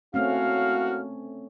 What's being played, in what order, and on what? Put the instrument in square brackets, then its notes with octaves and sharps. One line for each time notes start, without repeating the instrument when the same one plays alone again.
[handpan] A3 C4 C#4 [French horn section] A#3 E4 F#4 [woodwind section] F5 F6